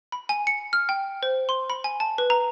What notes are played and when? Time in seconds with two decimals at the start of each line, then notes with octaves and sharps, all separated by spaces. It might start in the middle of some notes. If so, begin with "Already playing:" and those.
0.12 B5
0.29 G#5
0.47 C#7
0.73 F6
0.89 G5
1.23 C5
1.49 C6
1.70 B5
1.84 G#5
2.00 A5
2.18 B4
2.30 A#5